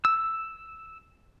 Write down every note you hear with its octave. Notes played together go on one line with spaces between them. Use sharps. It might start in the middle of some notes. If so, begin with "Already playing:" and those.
E6